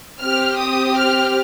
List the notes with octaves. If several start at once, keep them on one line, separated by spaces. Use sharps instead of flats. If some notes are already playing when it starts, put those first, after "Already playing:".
C4 G4 F6
D#6
F6